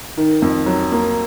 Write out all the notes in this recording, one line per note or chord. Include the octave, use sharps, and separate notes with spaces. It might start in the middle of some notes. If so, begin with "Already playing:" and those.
D#3
F2
F#3
A#3